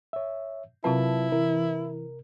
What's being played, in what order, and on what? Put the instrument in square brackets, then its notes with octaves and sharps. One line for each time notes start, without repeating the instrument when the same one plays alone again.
[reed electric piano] C#5 E5
[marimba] C3 C4 [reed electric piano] F#3 F4 B4 [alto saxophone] E4 [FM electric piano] A5
[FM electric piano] E3 [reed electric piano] A#4